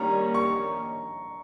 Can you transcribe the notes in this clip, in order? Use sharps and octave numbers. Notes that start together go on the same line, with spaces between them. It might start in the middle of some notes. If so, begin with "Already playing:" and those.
Already playing: D#3 G3 A#3 C#4 A#5
C#6